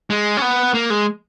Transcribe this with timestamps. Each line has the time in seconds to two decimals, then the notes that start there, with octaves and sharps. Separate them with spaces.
0.10 G#3
0.37 C#4
0.42 B3
0.74 A#3
0.90 G#3